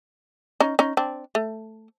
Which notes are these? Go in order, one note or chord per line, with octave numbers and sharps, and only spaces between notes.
C#4 D#4
C#4 D#4
C4 D4
A3